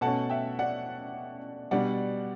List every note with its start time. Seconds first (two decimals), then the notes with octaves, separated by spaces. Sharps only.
0.01 B2 A3 C#4 F#5 A5
0.30 E5 G5
0.59 D5 F#5
1.71 B2 G3 D4 D5 F#5